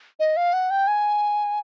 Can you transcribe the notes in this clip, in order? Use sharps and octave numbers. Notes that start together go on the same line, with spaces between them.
D#5
F5
F#5
G5
G#5